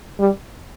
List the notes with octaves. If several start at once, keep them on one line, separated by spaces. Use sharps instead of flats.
G3